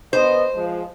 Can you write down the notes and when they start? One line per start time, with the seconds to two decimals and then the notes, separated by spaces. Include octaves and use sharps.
0.13 B2 B3 C5 D#5
0.55 F3 G#3